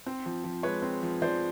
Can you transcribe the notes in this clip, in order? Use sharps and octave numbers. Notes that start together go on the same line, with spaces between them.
C4
F3
F3
G#3 B4 C#5
C4
F3
F3 C5 D5